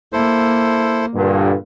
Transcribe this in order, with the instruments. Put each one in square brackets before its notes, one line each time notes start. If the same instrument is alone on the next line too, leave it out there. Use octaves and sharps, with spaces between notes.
[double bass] A#3 [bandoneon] E4 A4 C5
[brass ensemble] G2 A#2 D3